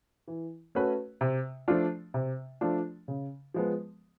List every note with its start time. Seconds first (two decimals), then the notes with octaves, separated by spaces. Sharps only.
0.28 E3
0.75 A3 C#4 F#4 B4
1.21 C3
1.68 F3 A3 D4 F4
2.14 C3
2.61 F3 A3 D4 F4
3.08 C#3
3.54 F3 G#3 B3